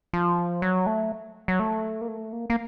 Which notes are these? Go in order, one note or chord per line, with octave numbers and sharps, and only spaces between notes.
F3
F#3
A3
F#3
A3
A#3
A3
A#3
A#3